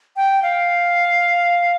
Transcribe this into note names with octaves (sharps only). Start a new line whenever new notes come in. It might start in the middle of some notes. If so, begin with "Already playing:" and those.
G5
F5